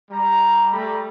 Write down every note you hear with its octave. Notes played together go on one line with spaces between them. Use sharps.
G3 A#5
G3 A3 G4 A4 A#5 B5